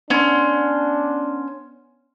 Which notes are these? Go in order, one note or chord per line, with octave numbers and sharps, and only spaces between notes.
B3 C#4 D4 C6